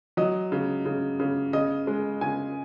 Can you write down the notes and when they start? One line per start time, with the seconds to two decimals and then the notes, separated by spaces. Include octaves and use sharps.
0.17 F#3 D#5
0.52 C#3
0.86 C#3
1.20 C#3
1.53 C#3 D#5
1.87 G#3
2.21 C#3 G#5